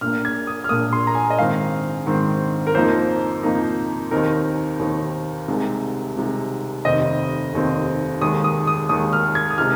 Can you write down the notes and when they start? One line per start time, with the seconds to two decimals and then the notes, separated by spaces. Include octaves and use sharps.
0.01 A#1 F6
0.04 A#2 A#3
0.25 G#6
0.47 D#6
0.64 F6
0.69 A#1 A#2 A#3 D#6
0.93 C6
1.07 A#5
1.15 G#5
1.30 D#5
1.38 G#2 D#3 C4 F5
2.06 G#2 D#3 C4
2.67 A#4
2.74 F2 F3 A#3 D#4 C5
3.43 F2 F3 A#3 D#4
4.11 D#2 D#3 C4 D#4 A#4
4.79 D#2 D#3 C4 D#4
5.48 C2 C3 G#3 D#4
6.16 C2 C3 G#3 D#4
6.85 F1 D#2 D#3 C4 D#5
7.53 F1 D#2 D#3 C4
8.21 D#2 D#3 G#3 D#6
8.44 D#6
8.67 D#6
8.89 D#2 D#3 G#3 D#6
9.13 F6
9.35 G#6
9.51 D#6
9.58 C3 G#3 D#4 F6